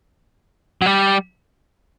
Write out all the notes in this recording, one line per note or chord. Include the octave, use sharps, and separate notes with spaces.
F#3
G3